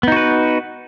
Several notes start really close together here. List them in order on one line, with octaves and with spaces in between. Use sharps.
B3 D#4 F#4 B4